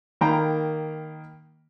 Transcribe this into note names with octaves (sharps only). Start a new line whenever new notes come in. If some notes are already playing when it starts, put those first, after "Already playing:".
D#3 A#3 G5 A#5 B5